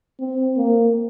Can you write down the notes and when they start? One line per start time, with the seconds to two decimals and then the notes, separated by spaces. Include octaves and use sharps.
0.20 C4
0.56 A#3